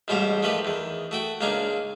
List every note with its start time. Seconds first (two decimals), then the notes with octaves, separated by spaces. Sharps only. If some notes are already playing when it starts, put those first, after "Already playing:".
0.08 A1 G#2 B2 G3 C5 F5
0.43 D#3 F3 A3 G4 B4
0.65 E2 D#3
1.11 A3 F#4 G5
1.41 C#2 A#3 D4 D#4 G#5